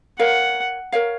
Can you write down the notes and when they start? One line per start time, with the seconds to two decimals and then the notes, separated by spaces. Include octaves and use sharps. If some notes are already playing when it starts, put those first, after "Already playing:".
0.19 A#4 C#5 F5 F#5
0.92 A#4 C#5 F5